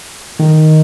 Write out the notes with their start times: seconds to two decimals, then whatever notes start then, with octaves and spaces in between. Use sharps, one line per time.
0.39 D#3